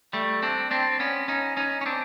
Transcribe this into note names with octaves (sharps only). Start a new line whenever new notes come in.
G3 A3
C4 D4
C4 D4
B3 C#4
C#4 D#4
C#4 D#4
C#4
C4 D4